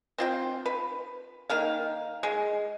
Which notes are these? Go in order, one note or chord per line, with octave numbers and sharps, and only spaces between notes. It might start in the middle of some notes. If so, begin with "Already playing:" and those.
C4 F4 G5
B4
D#3 A#3 F5
G#3